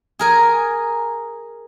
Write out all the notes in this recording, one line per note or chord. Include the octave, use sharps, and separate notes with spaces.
G#4 A#4 G#5